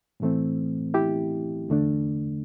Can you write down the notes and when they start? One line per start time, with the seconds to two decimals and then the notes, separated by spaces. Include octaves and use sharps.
0.20 A2 E3 A3 C4
0.94 E4 G4
1.69 E2 D3 A3 D4